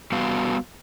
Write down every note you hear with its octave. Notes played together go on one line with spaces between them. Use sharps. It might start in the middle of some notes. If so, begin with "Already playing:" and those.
G3 B3 F#4 B4 F5